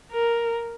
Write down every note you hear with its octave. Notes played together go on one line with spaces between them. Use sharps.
A#4